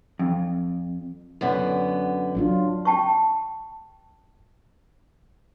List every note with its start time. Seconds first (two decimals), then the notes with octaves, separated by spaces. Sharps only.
0.19 F2
1.41 F#2 D3 B3
2.35 F#3 D4 F4
2.85 G5 A5 C#6